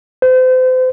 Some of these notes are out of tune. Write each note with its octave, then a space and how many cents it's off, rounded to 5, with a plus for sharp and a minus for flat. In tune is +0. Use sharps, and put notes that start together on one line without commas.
C5 -35